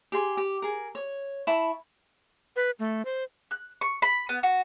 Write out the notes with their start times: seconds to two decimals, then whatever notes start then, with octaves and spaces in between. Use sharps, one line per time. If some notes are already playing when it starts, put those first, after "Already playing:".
0.12 G4 G#4 C6
0.37 G4
0.62 G#4 A#4
0.95 C#5
1.47 E4 A5 B5 C#6
2.56 B4
2.79 A3
3.05 C5
3.51 F#6
3.81 C#6
4.02 B5
4.29 B3
4.43 F#4